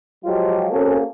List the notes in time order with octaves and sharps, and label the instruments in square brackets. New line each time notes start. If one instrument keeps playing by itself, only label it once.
[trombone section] F3 F#3 G#3 F4 G4
A#3 C4 C#4 F#4 G#4 A4